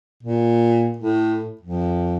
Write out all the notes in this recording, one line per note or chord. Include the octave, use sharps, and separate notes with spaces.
A#2
A2
F2